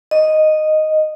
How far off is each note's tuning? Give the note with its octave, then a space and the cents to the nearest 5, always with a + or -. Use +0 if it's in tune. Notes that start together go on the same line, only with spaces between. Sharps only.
D#5 -5